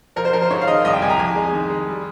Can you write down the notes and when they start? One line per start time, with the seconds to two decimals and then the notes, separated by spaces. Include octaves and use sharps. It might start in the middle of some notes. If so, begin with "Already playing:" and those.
0.16 F3 A#4
0.25 C5
0.33 F3 A#4
0.42 C5
0.51 G#2 C#5
0.61 F5
0.67 D#3 D#5
0.85 C2 D#5
0.93 G5
1.02 C2 G#5
1.10 A#5
1.19 F2 G#5
1.36 G#3
1.53 D#3
1.70 G#3
1.88 G3